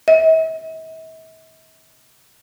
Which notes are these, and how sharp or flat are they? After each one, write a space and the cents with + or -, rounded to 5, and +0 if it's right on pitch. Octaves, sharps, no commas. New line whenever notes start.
E5 -45